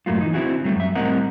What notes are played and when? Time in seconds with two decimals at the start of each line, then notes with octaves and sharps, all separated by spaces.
0.06 F#2 A2 F#3 A3 A#3 F4
0.20 E3 D#4
0.33 D3 C4 E4 F#4 G#4
0.64 F#3 G3 A3 C4
0.76 F#2 E5
0.95 A2 G3 C4 A#4 D#5 F#5